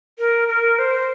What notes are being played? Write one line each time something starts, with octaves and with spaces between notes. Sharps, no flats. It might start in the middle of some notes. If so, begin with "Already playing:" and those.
A#4
A#4
C5